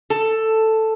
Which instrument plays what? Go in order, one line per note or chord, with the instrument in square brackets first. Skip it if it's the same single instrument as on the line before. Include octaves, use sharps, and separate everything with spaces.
[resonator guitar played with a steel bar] A4